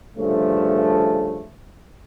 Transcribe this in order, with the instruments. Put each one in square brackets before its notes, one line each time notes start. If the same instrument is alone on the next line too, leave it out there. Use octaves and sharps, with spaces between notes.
[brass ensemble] D2 G2 C#3 F3 A3